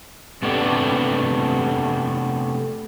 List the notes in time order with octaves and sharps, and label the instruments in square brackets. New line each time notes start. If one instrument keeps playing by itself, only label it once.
[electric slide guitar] C3 A3 B3 D4 G4